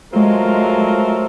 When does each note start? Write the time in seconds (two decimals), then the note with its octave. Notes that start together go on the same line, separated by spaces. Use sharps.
0.13 F#3 G#3 A3 C4 F4 A#4
0.45 G#3